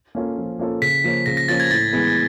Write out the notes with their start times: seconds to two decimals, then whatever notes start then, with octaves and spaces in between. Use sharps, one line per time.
0.15 A#3 C#4 F4 A4
0.38 F3
0.59 A#3 C#4 F4 A4
0.82 C#3 B6
1.04 F3 A#3 C#4
1.26 C#3 A#6
1.37 A#6
1.48 F3 A#3 C#4 A6
1.60 G#6
1.70 A2 A6
1.93 E3 G#3 B3